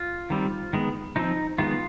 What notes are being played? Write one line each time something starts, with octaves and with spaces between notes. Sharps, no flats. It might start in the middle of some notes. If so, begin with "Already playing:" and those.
Already playing: F4
D#3 G3 C4
D#3 G#3 B3
F3 C4 D#4
D#3 G#3 B3 F4